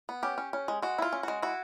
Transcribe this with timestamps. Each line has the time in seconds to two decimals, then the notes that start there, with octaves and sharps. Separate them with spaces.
0.09 B3
0.23 C#4 G4
0.38 C#4
0.53 C#4
0.68 G#3
0.82 G#3 F#4
0.98 E4 F4
1.13 C#4
1.23 G#3 F#4
1.42 E4 F#4